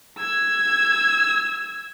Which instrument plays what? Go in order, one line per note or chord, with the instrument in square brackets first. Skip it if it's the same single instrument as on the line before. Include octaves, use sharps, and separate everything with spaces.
[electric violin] E6 G#6